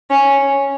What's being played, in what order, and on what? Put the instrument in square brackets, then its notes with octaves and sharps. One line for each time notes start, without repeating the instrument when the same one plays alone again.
[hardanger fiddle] C#4